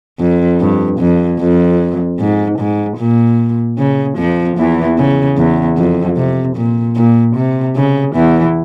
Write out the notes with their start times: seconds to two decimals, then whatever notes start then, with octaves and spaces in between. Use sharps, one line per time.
0.20 F2
0.60 G2
0.99 F2
1.40 F2
2.19 G#2
2.58 G#2
2.98 A#2
3.78 C#3
4.18 F2 F3
4.57 E2 E3
4.98 C#3
5.37 E2
5.77 F2
6.17 C3
6.56 A#2
6.96 A#2
7.36 C3
7.76 C#3
8.15 E2 E3